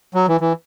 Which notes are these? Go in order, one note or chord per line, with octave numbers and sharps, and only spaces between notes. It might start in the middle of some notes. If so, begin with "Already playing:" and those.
F#3
E3
E3